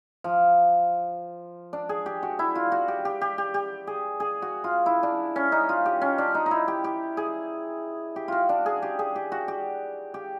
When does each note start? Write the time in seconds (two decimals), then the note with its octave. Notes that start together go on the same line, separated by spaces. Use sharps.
0.24 F3
1.73 D4
1.89 G#4
2.06 G4
2.23 F#4
2.39 E4
2.55 F4
2.72 F#4
2.88 G4
3.05 G4
3.21 G4
3.38 G4
3.54 G4
3.87 G#4
4.20 G#4
4.42 F#4
4.64 F4
4.86 E4
5.03 D4
5.36 C#4
5.52 D#4
5.69 F4
5.86 G4
6.02 C#4
6.18 D4
6.35 D#4
6.46 D#4
6.51 E4
6.68 G4
6.84 G4
7.17 G#4
8.16 G4
8.28 F4 F#4
8.49 D4
8.66 G#4
8.82 G4
8.99 G#4
9.16 G4
9.32 F#4
9.48 G4
10.14 G4